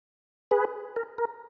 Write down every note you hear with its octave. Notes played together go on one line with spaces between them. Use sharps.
G#4 B4
A#4
A#4